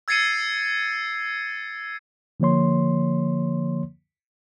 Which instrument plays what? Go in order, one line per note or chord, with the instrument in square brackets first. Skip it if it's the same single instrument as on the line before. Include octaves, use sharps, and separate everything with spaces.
[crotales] E6 G#6 A6 C7 C#7 D#7
[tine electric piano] D3 F3 A#3 C#5 C6